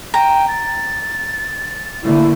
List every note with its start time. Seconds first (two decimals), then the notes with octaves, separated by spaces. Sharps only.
0.14 G5 A#5
0.48 A6
2.03 D3 A3 A#3 E4